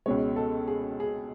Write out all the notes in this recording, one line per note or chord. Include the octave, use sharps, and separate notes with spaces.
C#2 B2 G#3 C#5
A4
G#4
G#4